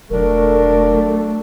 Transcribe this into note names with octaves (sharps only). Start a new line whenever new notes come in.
E1 F#3 A3 D4 A#4